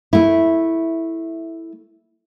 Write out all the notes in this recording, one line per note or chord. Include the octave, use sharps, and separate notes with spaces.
A3 E4